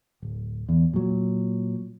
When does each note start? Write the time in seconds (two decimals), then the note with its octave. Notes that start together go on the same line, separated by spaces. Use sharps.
0.22 D1
0.69 E2
0.93 A#2 F#3